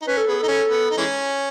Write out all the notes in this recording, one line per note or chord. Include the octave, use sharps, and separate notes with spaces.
D#4
C#4 B4
A4
B3 G#4
D#4 A4
C#4
B3
D#4
E3 G#3 C#4